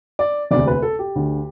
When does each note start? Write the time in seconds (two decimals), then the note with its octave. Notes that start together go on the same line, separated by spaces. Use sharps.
0.19 D5
0.51 E1 D2 C3 D5
0.67 B4
0.82 A4
0.99 G4
1.16 D2 D3